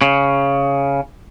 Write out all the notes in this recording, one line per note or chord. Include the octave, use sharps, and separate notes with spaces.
C#3